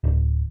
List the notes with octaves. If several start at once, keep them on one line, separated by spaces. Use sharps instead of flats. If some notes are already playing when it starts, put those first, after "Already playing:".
D1